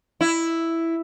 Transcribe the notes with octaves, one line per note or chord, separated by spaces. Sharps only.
E4